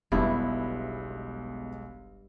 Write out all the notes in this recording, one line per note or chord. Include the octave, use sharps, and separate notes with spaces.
F1 B1 G2 G#3 B3 E4 E5